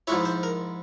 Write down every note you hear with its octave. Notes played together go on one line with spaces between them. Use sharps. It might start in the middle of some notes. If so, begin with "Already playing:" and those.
G#2 F3 G#3 E4 C#5
C5
A#4